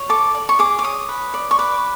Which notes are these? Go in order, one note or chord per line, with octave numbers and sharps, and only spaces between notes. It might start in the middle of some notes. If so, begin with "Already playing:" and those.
Already playing: C#5
A4 D6
D5
C#6
G#4 D6
D6
C#5 D#6
B4
D5
C#6
B4 D6